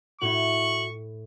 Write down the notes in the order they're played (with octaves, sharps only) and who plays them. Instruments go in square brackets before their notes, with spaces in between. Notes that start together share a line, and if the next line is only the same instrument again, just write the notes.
[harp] A2 [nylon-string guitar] E4 F#4 [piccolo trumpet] C#6 [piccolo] F#7